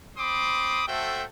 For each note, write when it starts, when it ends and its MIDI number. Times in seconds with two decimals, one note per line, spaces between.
0.18 0.83 60
0.18 0.83 83
0.18 0.83 84
0.18 0.83 86
0.18 0.83 87
0.88 1.24 57
0.88 1.24 66
0.88 1.24 69
0.88 1.24 72
0.88 1.24 76
0.88 1.24 79